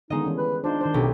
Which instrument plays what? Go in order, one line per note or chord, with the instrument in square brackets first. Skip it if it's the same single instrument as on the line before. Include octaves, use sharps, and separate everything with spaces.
[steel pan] D3 D#3 B3 [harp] G#3 D#5 [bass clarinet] D#4
[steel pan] E3 G3 C#4
[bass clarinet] B4
[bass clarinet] D4 [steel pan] D#4 F4 C5
[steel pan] D#3 C5
[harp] B1 [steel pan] C#4 G4